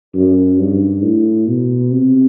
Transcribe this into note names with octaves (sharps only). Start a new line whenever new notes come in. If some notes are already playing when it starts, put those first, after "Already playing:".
F#2
G2
A2
B2
C3